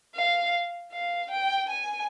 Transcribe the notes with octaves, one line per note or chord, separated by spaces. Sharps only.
F5
F5
G5
G#5